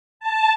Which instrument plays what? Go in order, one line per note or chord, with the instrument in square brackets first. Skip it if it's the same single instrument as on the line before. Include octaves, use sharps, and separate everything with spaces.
[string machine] A5